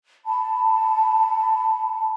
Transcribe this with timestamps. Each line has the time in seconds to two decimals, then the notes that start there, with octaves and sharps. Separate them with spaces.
0.25 A5 B5